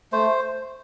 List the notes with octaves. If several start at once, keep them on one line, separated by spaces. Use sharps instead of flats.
A3 C5